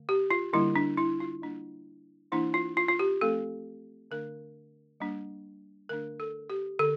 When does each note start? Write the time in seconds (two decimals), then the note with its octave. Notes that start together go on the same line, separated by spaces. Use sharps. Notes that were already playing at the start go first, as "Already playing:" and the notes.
Already playing: D3 A3
0.09 G4
0.31 F4
0.53 D3 G3 A#3 D4 E4
0.76 D4
0.98 E4
1.20 F4
1.42 G3 A#3 D4
2.32 E3 A#3 D4 E4
2.54 F4
2.77 F4
2.88 F4
2.99 G4
3.21 F3 A3 C4 A4
4.11 D3 A3 D4 A#4
5.00 G3 A#3 D4
5.89 D3 A3 D4 A#4
6.20 A4
6.50 G4
6.79 D3 A4